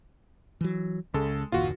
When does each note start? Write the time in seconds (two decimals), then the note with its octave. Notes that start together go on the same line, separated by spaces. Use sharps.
0.61 E3 F#3
1.14 C#2 C#3 G#3 A4
1.52 F#1 D#2 A#2 F4 F#4